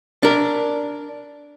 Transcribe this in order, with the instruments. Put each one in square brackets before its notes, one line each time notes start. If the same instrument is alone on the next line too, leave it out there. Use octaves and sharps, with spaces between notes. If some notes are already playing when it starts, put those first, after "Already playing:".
[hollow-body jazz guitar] D4 A#4